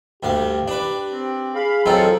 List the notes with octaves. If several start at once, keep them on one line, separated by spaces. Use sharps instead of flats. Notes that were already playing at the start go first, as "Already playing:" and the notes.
D2 G2 G4 F5
D4 B4
C4
G#4 F5 B5
F#3 C4 D#4 F4 A4